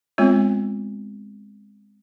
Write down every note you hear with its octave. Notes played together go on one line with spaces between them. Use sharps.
G#3 B3 C4 F4 C#5